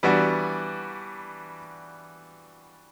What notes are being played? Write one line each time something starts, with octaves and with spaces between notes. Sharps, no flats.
E3 G3 B3 D4 F#4